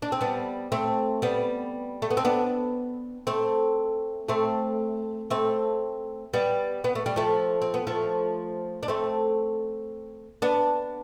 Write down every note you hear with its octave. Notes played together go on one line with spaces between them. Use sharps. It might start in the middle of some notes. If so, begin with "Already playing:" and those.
D4
C4
G3 B3
A3 C4
G3 B3
A3
B3
C4
B3 D4
A3 C4
A3 C4
A3 C4
G3 B3
B3
A3
G3
F3 A3
C4
B3
F3 A3
D4
A3 C4
B3 D4